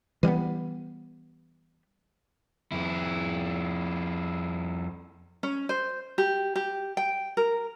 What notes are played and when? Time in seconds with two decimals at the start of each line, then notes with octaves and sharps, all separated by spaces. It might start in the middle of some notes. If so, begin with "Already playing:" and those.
0.23 E3 G3 A#3 B3
2.72 F2 E4
5.43 C#4
5.69 C5
6.18 G4
6.56 G4
6.97 G5
7.37 A#4